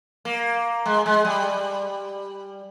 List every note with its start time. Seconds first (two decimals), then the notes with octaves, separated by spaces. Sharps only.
0.25 A#3
0.86 G#3
1.06 G#3
1.25 G3